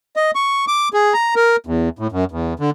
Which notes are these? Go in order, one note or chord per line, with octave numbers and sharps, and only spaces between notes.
D#5
C#6
D6
G#4
A#5
A#4
E2
A2
F#2
E2
D3